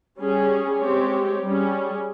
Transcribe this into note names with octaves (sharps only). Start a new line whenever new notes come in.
G3 C#4 G#4
G#3 C4 G4 C#5
G3 C#4 G#4